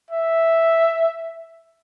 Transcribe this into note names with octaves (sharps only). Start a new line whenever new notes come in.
E5